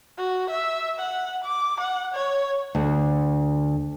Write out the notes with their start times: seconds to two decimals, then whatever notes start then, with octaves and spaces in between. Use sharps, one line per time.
0.18 F#4
0.50 E5
0.99 F#5
1.44 D6
1.80 F#5
2.14 C#5
2.75 D2